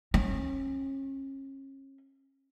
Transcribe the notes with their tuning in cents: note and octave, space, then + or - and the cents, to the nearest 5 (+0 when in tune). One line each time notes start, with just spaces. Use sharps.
C#4 -35